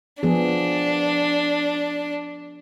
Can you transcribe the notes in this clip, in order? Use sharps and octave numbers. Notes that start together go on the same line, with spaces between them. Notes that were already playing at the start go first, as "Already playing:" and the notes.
F3 B3 D4 G#4